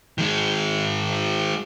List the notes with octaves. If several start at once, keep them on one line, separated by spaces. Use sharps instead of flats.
D#3 G#3